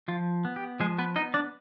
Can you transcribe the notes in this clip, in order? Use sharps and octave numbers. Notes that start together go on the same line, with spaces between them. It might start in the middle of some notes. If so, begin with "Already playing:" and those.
F3 F4
B3
G4
F3 G#3 G#4
B3 B4
B3 D#4 D#5
D4 D5